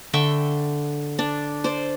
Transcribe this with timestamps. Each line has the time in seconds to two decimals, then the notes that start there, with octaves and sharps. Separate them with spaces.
0.13 D3 E5 G5 C#6
1.19 D4
1.64 C5 D5